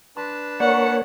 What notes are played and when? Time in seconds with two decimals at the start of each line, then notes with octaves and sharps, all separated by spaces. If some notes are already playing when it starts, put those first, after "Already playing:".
0.17 D4 B4 A5 C6
0.60 A#3 C#5 D5 F#5